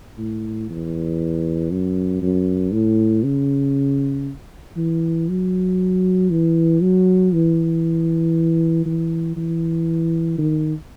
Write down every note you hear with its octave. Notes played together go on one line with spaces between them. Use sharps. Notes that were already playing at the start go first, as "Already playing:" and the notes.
A2
E2
F#2
F#2
A2
C#3
E3
F#3
E3
F#3
E3
E3
E3
D#3